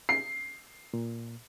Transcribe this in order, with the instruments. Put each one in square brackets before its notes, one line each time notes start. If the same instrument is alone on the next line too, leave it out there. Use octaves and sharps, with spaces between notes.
[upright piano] C7
[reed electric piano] A#2